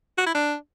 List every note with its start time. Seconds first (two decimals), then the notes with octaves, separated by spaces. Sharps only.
0.18 F#4
0.26 E4
0.35 D4